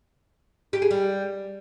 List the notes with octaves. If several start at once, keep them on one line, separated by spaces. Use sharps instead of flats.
G4
G#4
G3